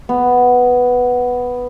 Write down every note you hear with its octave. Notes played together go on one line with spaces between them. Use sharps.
B3